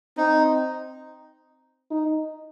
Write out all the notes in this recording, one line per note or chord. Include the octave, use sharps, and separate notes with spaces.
C4 D#4
D#4